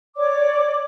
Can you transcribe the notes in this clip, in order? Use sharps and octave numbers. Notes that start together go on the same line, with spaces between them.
C#5 D5 D6